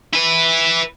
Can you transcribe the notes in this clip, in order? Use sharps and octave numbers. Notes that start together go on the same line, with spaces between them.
E4 B4